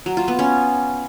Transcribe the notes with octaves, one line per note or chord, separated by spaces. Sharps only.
F#3
F4
B3
C#4